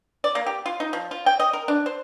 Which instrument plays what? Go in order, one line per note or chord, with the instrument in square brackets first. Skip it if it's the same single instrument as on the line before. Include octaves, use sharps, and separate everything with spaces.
[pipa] D5
A#3
G4
F4
D#4
F3
F4
G5
D#5
A#4
D4
C5